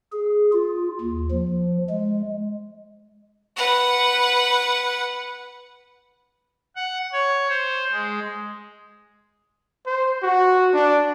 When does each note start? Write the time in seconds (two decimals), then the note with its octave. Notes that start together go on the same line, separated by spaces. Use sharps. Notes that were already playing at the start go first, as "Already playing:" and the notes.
0.12 G#4
0.53 F4
1.01 D#2
1.31 F3
1.89 G#3
3.56 B4 F#5
6.76 F#5
7.12 C#5
7.49 C5
7.92 G#3
9.86 C5
10.22 F#4
10.74 D4